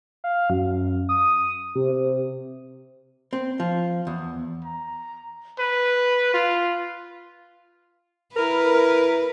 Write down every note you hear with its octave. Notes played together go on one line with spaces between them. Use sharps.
F5
F#2
D#6
C3
C3
C4
F3
E2
A#5
B4
F4
E4 A#4 B4